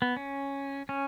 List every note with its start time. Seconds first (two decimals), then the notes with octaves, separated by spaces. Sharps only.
0.02 B3
0.16 C#4
0.89 C#4